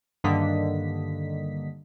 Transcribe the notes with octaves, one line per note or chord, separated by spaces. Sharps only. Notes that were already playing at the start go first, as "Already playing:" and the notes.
G2 D3 D#3 A#3 D#5 B6